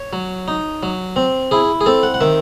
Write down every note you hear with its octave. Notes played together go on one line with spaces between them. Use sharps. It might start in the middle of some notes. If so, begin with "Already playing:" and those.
Already playing: C#5
F#3
D#4
F#3
C4
E4 G#4
G#4
C4 A4
F#5
F#5
D#3 E5